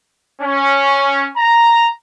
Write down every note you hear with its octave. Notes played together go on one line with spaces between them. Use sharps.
C#4
A#5